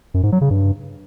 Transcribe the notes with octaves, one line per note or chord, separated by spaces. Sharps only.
F#2
G#2
F#3
C#3
G2